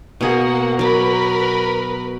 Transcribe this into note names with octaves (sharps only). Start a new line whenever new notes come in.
B2 A#3 G#4 F#5
F#3 A#4 B4 B5 D6